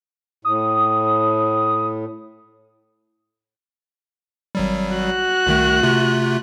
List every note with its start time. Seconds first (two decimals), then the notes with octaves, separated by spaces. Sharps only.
0.45 A2 D#6
4.55 G#1 F#3 G3
4.93 F#4 F#6
5.47 C2 D#3 A3
5.83 C3 A3 F4